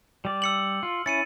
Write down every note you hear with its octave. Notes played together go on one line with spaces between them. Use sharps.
G3 D5
E6 C#7 F#7
F4
C#4 E4 A6 C#7 D#7